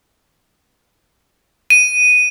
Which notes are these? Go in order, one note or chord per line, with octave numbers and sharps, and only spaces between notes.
D#7